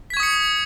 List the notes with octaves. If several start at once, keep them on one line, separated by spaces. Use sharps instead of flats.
C#6 D#6 G#6 B6 C#7